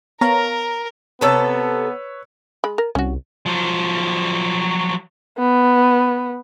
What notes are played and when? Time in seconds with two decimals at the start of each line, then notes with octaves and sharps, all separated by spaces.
0.21 B3 A#4 C#5 F5 A#5
1.21 C3 B3 A4 B4 C#5 A#5 E6
2.64 G#3 B5
2.78 A#4
2.95 C2 C#4 F#4
3.46 F3 F#3
5.38 B3